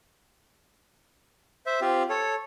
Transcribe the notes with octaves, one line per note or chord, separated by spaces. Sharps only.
C5 E5
C4 F4 G4
A4 C#5